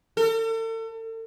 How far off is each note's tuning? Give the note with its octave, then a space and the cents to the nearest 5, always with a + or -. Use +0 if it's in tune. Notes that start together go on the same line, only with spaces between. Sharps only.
A4 +40